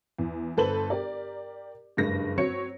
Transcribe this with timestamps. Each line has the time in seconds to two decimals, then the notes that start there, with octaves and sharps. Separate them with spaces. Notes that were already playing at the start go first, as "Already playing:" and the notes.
0.19 E2
0.57 G1 A4 B4 C5 F#7
0.90 G4 A#4 D5
1.97 F#1 G2 G#3 A#6
2.38 F#3 C4 C#5 C#7